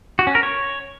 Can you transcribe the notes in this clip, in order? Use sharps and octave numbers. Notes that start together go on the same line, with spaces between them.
F#4
C#4
A#4
C#5